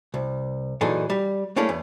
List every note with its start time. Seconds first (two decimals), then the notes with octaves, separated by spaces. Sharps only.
0.14 C2
0.81 A#2 E3 F#3 D#4 G#4 A4
1.10 G3
1.56 A3 A#3 C#4 E4 G#4 D5
1.69 E2